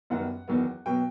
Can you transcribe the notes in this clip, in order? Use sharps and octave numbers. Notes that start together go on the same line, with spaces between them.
F#2 D#3 G3 B3 F#5
E2 D#3 F#3 B3
B2 F#3 B3 G5